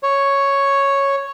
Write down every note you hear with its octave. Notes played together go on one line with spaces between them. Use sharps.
C#5